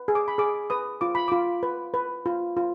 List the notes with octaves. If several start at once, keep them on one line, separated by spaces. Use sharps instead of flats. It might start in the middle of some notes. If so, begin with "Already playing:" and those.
Already playing: B4
G#4
D6
B5
G#4 D6
B4 D#6
F4 D6
B5
F4 D6
B4
B4
F4
F4